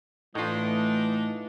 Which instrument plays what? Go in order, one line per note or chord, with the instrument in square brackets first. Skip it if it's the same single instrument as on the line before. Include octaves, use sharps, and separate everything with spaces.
[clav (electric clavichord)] A2 F4 [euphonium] E3 [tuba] A3 [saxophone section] D4 D#4